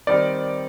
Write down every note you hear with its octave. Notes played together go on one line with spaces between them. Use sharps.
D#3 G3 C4 D#4 A#4 D5